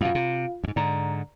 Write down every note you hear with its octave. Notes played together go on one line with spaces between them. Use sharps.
F#2 B2 F4 F5
C3
D2 G#2
G#2 D3 D5 A#5